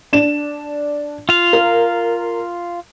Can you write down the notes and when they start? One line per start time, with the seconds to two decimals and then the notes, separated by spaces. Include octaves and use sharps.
0.13 D4 E7
1.29 F4 F5
1.53 A#4